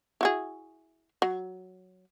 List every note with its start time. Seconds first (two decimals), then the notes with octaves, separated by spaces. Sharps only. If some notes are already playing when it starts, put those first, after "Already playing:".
0.21 E4 F#4 G#4
1.22 F#3